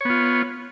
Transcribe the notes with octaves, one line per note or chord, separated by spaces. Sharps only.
B3 F4 C#5